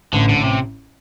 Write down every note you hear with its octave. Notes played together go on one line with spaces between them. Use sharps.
A1 D3
A1 D3
C3